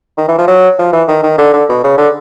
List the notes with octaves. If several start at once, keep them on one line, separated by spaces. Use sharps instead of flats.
D#3
E3
F3
F#3
F3
E3
D#3
D#3
D3
D3
B2
C#3
D3